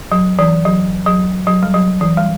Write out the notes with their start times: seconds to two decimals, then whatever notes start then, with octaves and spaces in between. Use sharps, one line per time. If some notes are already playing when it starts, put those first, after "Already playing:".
0.12 F#3
0.39 E3
0.65 F#3
1.06 F#3
1.47 F#3
1.63 G3
1.74 F#3
2.01 E3
2.17 G3